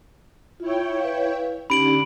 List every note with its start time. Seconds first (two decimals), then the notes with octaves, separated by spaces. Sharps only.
0.60 E4 F4 C#5 G5
1.00 B4 F5
1.70 D3 C#4 D#4 G4 B5 D7 F#7